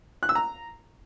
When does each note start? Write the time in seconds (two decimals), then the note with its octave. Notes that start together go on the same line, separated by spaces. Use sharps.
0.23 F#6
0.29 E6
0.35 A#5